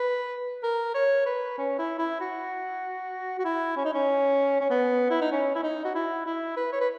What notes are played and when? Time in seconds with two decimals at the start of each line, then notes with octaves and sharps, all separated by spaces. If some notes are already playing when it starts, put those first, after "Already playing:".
Already playing: B4
0.63 A#4
0.94 C#5
1.26 B4
1.58 C#4
1.78 E4
1.99 E4
2.21 F#4
3.39 F#4
3.45 E4
3.77 C#4
3.85 D#4
3.93 C#4
4.61 C#4
4.70 B3
5.10 E4
5.22 D#4
5.32 C#4
5.55 E4
5.63 D#4
5.85 F#4
5.95 E4
6.26 E4
6.57 B4
6.72 C#5
6.81 B4